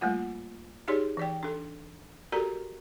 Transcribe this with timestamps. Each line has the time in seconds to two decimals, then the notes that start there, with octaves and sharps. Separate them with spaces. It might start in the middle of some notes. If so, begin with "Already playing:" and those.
0.01 G3 A3 A#3 F4 F#5
0.88 D#4 G4 G#4 C#5 D5 C6
1.17 E3 D5 G5
1.43 D4 A4
2.32 F#4 G4 A4 A#4 D5 A#5